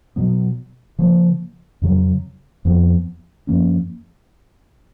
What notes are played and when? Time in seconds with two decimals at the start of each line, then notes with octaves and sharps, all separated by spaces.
0.16 B2 F#3 B3
0.99 C#3 F3 A#3
1.82 F2 C#3 F#3
2.65 F2 F3 B3
3.47 F#2 F3 A#3 C#4